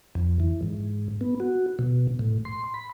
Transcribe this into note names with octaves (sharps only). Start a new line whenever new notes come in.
F2
E3
G#2
B3
F#4
B2
A2
C6
B5